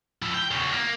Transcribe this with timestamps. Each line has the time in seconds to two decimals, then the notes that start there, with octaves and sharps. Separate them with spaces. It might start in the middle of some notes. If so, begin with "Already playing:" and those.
0.22 F3 E4
0.34 G5
0.51 E2 C#3
0.73 A#3